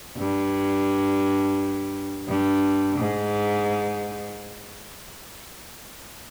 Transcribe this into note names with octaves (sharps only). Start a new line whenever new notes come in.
G2
G2
G#2